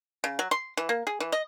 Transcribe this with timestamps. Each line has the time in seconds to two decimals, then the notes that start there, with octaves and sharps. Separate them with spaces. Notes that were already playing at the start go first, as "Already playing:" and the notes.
0.24 C#3
0.39 F#3
0.51 C6
0.77 E3
0.89 A#3
1.07 G#4
1.20 E3
1.32 D#5